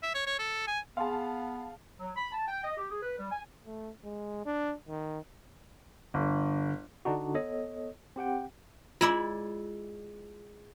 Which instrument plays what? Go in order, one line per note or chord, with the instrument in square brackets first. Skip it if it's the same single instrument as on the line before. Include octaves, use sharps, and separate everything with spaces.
[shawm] E5
C#5
C#5
A4
G#5
[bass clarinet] B3 [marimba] G#4 G#5 C6 [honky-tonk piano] F5 A5
[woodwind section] F#3
B5
A5
G5
D#5
G4
G#4
B4
G3
G#5
[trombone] A3
G#3
D4
D#3
[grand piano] G1 [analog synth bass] D3
[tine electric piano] D3 D4 D#4 F#4
B3 A4 C#5 D#5
C4 G4 F#5 G5
[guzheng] G#3 E4 D5 [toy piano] F4